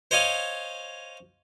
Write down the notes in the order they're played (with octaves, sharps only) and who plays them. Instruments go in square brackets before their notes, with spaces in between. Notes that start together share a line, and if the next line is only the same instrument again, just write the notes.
[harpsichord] C5 C#5 D#5 F5 G#5